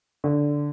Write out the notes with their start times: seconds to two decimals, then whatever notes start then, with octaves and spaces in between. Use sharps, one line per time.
0.24 D3